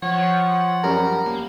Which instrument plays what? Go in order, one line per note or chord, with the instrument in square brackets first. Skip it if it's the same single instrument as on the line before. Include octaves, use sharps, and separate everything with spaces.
[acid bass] F3 [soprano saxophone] C#5 [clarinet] F#5
[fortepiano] F#2 G3 C#4 [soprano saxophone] A#4
[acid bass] A#3